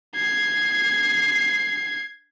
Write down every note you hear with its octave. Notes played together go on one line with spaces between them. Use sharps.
G#6 C7